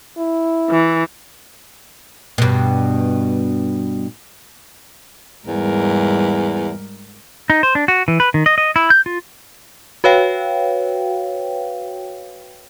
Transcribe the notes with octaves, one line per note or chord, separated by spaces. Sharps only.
E4
E3
G2 B2
E2 G#2 G3 A#4
D#4
C5
D4
F#4
E3
B4
D#3
D#5
D#5
E4
G6
F4
F#4 B4 C#5 F5 G5